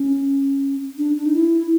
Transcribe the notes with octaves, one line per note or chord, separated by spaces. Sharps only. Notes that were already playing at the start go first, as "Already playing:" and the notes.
Already playing: C#4
D4
D4
D#4
E4